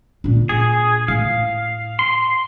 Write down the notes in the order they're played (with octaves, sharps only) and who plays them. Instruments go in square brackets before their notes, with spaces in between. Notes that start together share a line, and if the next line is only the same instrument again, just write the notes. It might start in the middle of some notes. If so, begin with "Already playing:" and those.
[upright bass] A#2 D4
[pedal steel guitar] G#4
[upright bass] A2 [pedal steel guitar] F5
[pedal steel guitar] C6